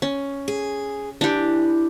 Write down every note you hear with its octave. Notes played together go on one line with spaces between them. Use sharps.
C#4
G#4
E3 D4 G4